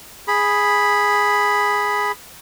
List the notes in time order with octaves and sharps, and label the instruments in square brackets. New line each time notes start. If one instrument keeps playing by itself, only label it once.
[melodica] G#4 B5